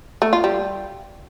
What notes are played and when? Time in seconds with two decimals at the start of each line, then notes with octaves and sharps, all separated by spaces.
0.22 A3
0.33 F4
0.44 G3